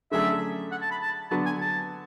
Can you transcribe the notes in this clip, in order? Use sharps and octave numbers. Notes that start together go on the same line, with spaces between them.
D3 F#3 A3 C#4 G#4 E5
F#5
A5
B5
A5
D3 F#3 B3 F#4 A5
G#5
A5